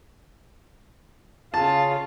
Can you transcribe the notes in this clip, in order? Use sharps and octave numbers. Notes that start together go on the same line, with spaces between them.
C#3 F4 A5